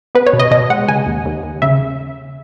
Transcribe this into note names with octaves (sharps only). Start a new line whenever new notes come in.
B3 B4
C#5
B2
D#5
B2 D#5
G#3 F#5
C#3 G#5
D#2
D#2
D#2
C#3 E5